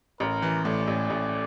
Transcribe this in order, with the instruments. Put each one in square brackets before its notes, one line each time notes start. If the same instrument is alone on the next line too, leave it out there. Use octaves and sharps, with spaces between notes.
[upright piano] A1 [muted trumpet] A#4
[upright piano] E3
[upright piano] A2 [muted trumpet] D5
[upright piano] A1
A1